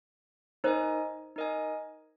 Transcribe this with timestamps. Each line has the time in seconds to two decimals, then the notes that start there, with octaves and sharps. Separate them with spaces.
0.64 D#4 A#4 C5 D#5 G#5
1.36 D#4 A#4 D#5 G#5